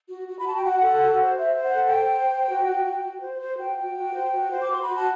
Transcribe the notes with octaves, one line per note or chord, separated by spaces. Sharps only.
F#4
F#4
B5
F#4 A5
G5
F#4 F#5
A4
F#4
C5
C5 E5
C5
F#5
A4
G5
C5
C5
C5
F#4
F#4
F#4
F#4
C5
C5
F#4 G5
F#4
F#4
C5
F#4
C5
D6
F#4 C6
F#4 B5
A5